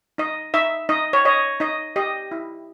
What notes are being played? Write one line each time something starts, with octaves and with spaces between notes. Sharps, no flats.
D#4 D#5
D#4 E5
D#4 D#5
C#5
C#5 D#5
D#4 D#5
G4 D#5
E4